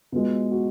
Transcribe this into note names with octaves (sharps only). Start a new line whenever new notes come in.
B2 G#3 F4
F#4